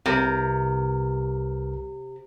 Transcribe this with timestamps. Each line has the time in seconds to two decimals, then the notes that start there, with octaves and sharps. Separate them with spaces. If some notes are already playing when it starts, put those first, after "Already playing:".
0.06 C2 C3 A#4 B4